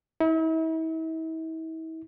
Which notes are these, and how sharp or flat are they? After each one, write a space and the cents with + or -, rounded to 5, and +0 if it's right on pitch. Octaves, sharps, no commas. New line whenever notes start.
E4 -40